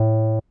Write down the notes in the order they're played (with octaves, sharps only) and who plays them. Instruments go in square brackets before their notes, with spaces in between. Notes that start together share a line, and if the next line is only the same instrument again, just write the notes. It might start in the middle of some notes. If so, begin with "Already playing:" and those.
Already playing: [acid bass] A2